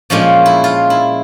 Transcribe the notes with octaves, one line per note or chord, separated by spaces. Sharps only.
A#2 F3 G#3 C#4 F4
E4
F4
E4